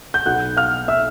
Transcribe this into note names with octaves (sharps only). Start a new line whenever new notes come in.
G6
B1 B2 F#3 B3 F#5 F#6
F5 F6
E5 E6